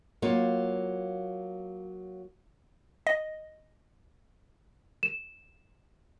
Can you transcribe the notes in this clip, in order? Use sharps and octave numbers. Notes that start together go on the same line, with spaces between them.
F#3 A#3 F4
D#5
E7